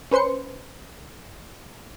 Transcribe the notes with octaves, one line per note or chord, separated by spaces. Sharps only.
C#4 B4 C5 C6 C#7